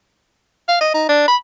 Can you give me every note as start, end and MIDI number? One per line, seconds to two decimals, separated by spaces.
0.69 0.78 77
0.81 0.89 75
0.94 1.04 63
1.09 1.27 62
1.28 1.36 83